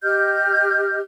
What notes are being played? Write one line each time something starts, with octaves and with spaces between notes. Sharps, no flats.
G4 D#5 F6 G6